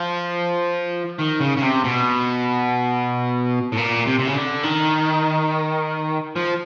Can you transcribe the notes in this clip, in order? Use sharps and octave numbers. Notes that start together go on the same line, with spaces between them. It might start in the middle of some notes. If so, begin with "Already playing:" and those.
Already playing: F3
D#3
C#3
C#3
C3
B2
A2
A#2
C3
C3
C#3
D3
D#3
F3